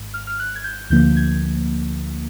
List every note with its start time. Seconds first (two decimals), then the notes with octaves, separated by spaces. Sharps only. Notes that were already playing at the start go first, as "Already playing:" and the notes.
Already playing: G#1 G#2
0.14 F6
0.27 F6
0.40 F#6
0.56 G#6
0.64 G6
0.90 D2 D3 F3 A#3 G6
1.17 G#6